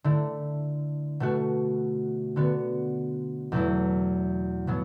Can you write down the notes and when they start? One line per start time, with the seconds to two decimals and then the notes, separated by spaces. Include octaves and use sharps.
0.04 D3 A3 E4
1.20 B2 A3 F#4
2.36 D3 B3 F#4
3.52 E2 B2 F#3 A3 E4
4.67 B2 F#3 B3